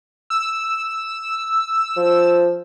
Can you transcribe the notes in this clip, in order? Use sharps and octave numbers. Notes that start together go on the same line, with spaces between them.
E6
F3